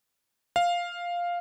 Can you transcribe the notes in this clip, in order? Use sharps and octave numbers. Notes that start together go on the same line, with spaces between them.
F5